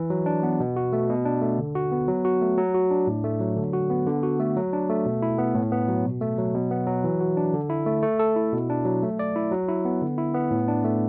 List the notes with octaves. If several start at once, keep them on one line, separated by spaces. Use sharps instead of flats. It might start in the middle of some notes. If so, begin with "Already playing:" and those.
Already playing: E3
F#3
D4
B3
B2
F#4
A3
B2
D4
A3
D3
F#4
B3
F#3
F#4
A3
F#3
F#4
D4
A2
A3
F#3
D3
F#4
B3
D3
F#4
A3
F#3
D4
A3
B2
E4
B3
A2
B3
F#3
B2
A3
F#3
B2
B3
F#3
E3
F#4
D4
D3
E4
A3
A3
A4
E4
B2
D4
F#3
A3
D5
E4
F#3
E4
B3
D3
E4
B3
A2
D4
A3